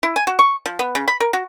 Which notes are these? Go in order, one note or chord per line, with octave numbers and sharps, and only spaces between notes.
E4
G#5
F#4
C#6
F3
B3
C#3
B5
A#4
F#4